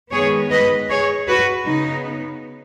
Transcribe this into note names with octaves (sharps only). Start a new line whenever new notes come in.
D#3 G#3 B3 G#4 C#5
B4 D#5
G#4 C#5
F#4 B4
C#3 B3 D#4